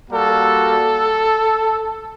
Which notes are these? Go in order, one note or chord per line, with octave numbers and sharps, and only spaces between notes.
G3 A#3 F#4 A4